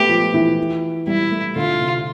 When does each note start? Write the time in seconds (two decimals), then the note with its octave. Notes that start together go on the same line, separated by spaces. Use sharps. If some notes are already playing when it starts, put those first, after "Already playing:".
Already playing: A3 B3 G4
0.09 F3
0.34 E3
1.07 G3 E4
1.31 A3
1.56 D3 F4
1.80 C3